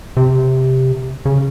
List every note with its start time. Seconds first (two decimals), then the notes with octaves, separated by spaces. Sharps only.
0.17 C3
1.25 C#3